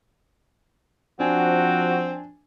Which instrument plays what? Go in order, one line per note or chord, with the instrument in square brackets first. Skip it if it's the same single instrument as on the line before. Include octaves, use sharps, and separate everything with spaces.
[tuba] F3 [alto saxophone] C4 [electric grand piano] D4 G#5 [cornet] F#4